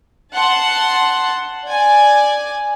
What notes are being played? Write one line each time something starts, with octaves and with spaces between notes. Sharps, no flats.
F#5 A5 C6
D5 G#5